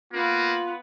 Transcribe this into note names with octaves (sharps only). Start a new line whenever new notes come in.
A#3 B3 F4 B4